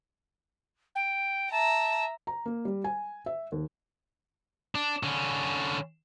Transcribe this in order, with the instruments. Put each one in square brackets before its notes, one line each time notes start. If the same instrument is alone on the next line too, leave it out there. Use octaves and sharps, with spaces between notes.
[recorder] G5
[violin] E5 A#5 [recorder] A5
[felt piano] A#5
A#3
G3
G#5
E5
D#2
[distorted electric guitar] D4
D3 C#4